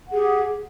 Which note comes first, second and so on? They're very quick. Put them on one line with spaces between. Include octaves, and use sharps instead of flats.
F#5 G#4 G4